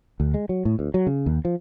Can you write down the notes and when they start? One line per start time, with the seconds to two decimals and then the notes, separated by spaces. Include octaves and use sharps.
0.20 D2
0.34 G#3
0.49 F#3
0.65 A2
0.79 D2
0.94 F#3
1.07 C#3
1.26 D#2
1.45 F3